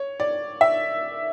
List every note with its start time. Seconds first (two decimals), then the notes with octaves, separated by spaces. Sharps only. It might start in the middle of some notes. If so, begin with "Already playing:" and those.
Already playing: C#5
0.20 D5
0.61 E5